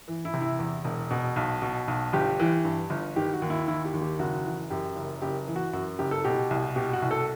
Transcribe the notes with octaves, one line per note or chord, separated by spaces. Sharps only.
E3
E4
C3
E4
E2
E1
B2
B1
B2
B1
G1 G4
E3
G2
G1
D#3 G4
F#4
D#2
E4
D#3 E4
G4
D#2
G4
F#1 F#4
E3
F#2 G4
F#1
F#1 G4
E3
F#4
F#2 F#4
F#1 G4
A4
B2 G4
C2
B2 G4
F#4
C2
A4